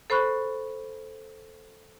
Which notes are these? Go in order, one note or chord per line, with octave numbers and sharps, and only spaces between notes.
A4 C5 B5 C#6 F#6